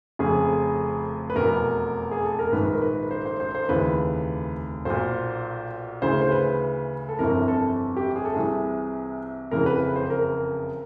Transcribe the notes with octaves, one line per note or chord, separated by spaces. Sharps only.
F1 F2 C#3 G#4
B4
F1 E2 B2 A#4
G#4
A4
A#4
A#1 G#2 D#3 B4
A#4
B4
C5
C5
C5
C5
F1 D#2 C#3 E3 B4
B1 A#2 C5
D2 C#3 E3 C5
C5
B4
A4
G1 F2 C3 E3 A#4
A4
G4
G#4
A4
C2 C3 E3 G#4
F#1 F2 C#3 E3 A#4
B4
C5
A#4